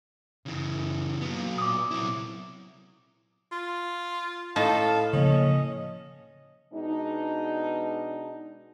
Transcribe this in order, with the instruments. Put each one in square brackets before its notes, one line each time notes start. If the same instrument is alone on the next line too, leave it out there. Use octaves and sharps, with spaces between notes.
[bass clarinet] F#2 [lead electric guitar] C#3 E3
[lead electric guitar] F#3 B3 [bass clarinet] A#3
[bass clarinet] A#2 [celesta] D6 D#6
[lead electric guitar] C3 E4 [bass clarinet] F#3
[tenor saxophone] F4
[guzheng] A2 D#4 [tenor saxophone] A4 [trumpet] F5
[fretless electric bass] C#3 F3 A#3 [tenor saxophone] C#4 [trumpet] D#5
[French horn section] B2 G#3 D4 D#4